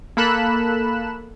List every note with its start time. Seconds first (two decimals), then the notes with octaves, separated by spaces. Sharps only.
0.17 A#3 A4 B5 F#6 E7